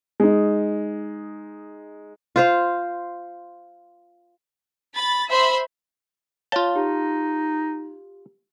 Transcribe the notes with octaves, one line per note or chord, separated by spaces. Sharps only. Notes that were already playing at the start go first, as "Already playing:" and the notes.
G#3 D#4
F4 C5 F5
B5 A6
C5 E5 B5 C6
F4 C#5 F5 A5 G7
D#4 G4